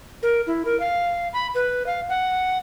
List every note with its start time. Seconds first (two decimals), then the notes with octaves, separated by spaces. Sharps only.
0.23 A#4
0.47 E4
0.65 A#4
0.80 F5
1.33 B5
1.55 B4
1.87 F5
2.09 F#5